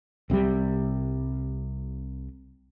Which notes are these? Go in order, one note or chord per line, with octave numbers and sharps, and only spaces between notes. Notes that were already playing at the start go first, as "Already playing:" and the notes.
C2 C3 F3 G3